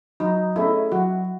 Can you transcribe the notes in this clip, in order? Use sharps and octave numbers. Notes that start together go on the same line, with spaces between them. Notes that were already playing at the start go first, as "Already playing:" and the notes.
F#3 D#4
A3 C#4 E4 G#4 D#5
F#3 F#4